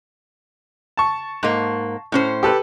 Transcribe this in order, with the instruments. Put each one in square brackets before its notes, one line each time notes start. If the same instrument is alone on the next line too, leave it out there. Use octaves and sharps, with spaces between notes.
[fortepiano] A5 C#6
[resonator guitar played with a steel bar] G#2 A#3
A2 C#4 C5
[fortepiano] G4 A4 B4